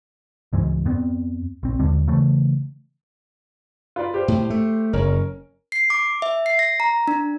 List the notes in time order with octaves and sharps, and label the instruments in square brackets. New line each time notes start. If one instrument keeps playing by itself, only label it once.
[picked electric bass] C#2 G#2 E3 G#3
F2 B3 C4
A#1 C4
D#2 D3 G#3
C#3 E3 A3
[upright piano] F4 B4 D5
G4 C5
[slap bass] A2
A3
[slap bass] F#1 [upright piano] C#4 A#4
[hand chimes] C7
D6
E5
C7
A#6
A#5
D4